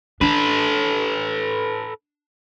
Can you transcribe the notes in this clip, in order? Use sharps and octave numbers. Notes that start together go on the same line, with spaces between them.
D4 A4 B4